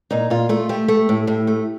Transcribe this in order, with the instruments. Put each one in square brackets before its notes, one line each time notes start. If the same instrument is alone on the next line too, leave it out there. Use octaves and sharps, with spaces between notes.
[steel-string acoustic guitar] A#2 D#4
A#2 F4
A3 F4
A3 G4
A3
A2
A2
A3